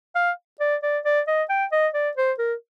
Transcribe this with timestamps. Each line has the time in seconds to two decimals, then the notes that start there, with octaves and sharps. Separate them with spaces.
0.16 F5
0.60 D5
0.83 D5
1.05 D5
1.28 D#5
1.49 G5
1.72 D#5
1.94 D5
2.17 C5
2.39 A#4